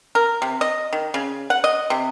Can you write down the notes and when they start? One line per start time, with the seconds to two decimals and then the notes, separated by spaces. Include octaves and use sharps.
0.15 A#4
0.42 C3
0.61 D#5
0.93 D#3
1.14 C#3
1.50 F#5
1.64 D#5
1.90 C3